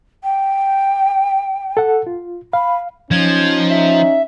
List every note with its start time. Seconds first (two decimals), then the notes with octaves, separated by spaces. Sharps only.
0.23 G5
1.77 A4 F#5
2.07 F4
2.53 F5 B5
3.11 F3 C#4 D#4 G#6
3.70 E5